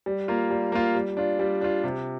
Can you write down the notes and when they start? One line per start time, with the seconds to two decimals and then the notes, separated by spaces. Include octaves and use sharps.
0.06 G3
0.28 A#3 F4
0.51 G3
0.72 A#3 F4
0.95 G3
1.17 D4 F4
1.39 G3
1.61 D4 F4
1.84 C3